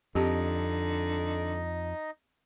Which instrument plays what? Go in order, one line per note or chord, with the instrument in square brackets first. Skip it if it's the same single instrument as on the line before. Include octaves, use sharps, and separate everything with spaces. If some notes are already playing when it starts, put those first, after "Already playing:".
[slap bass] F2 [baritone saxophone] D3 [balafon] C4 G4 [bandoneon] D#4 D#5